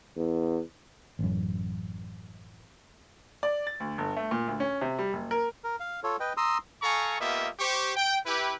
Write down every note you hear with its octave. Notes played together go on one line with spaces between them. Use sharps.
E2
A1 F#2
D5
A6
D2
G1
A3
A#2
D2
C#4
C3
G3
F#1
A#4
A#4
F5
F4 A4 C#5
B4 D#5 G5
A#5 C6 D#6 E6
A4 F5 G#5 A#5 C#6
A#3 B3 F4 G4 D#5 E5
G4 C5 C#6
G5
E4 G4 B4